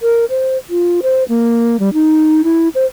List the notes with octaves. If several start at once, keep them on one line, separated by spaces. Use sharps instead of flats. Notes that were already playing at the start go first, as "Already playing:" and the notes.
A#4
C5
F4
C5
A#3
G3
D#4
E4
C5